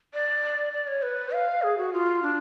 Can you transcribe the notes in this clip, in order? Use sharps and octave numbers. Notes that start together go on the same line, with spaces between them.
D5
D5
C#5
B4
F5
G#4
F#4
F4
D4